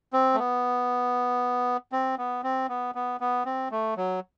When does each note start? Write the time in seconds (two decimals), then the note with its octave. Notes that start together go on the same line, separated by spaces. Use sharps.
0.13 C4
0.34 A3
0.39 B3
1.92 C4
2.18 B3
2.44 C4
2.69 B3
2.95 B3
3.20 B3
3.45 C4
3.71 A3
3.97 F#3